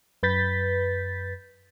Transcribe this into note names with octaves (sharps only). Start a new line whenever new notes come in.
F#2 B4 G6 A6 B6